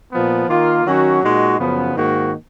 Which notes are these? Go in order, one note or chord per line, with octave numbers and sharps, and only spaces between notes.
A#2 F3 B3
D#3 A#3 F4
D#3 F#3 C#4 F#4
A#2 G#3 D#4 F#4
F#2 C#3 F3 B3
G#2 D#3 A#3 D#4 F#4